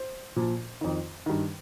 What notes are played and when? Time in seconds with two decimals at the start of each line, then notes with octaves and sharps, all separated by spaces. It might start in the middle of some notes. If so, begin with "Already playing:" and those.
Already playing: C5
0.36 A#2 F3
0.81 F2 D#3
1.26 G2 D#3